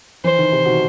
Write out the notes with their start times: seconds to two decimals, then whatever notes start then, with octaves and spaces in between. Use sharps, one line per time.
0.24 E3 C5
0.38 D#3
0.52 C3
0.65 B2 D#3